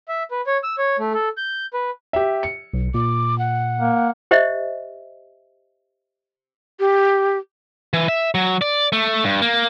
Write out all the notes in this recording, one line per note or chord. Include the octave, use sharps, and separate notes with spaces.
E5
B4
C#5
E6
C#5
A3
A4
G6
B4
G4 E5
C#7
B1
A#2 D6
F#5
A#3
G4 C5 D#5 E5
G4
E3
E5
F#3
D5
A3
G2
A#3